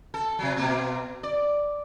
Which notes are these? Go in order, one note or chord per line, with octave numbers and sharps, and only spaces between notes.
A4
C3 F#3
B2 A#3 C4
D5